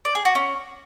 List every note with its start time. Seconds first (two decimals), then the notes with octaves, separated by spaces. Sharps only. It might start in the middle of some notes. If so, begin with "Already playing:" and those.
0.05 D5
0.15 G#4
0.25 F#4
0.35 C#4